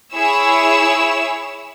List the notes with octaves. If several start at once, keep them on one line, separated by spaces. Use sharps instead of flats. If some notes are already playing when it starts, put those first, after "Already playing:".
E4 G#4 C#5 E6